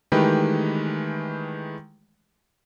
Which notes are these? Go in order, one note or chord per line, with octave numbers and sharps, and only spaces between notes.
D#3 E3 G#3 A3 G4 B4